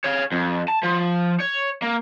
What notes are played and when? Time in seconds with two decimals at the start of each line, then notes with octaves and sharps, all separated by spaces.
0.04 C#5 F5
0.32 F2
0.68 A5
0.83 F3
1.40 C#5
1.82 A#3